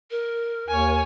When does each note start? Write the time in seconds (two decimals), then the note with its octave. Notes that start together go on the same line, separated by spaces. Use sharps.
0.11 A#4
0.68 D#2 C#5 G#5